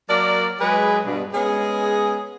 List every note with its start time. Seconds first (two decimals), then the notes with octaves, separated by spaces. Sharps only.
0.09 F#3 A#3 A#4 D5
0.60 F#3 G#3 G#4 B4
1.05 G2 B2
1.33 G#3 B3 C#4 G#4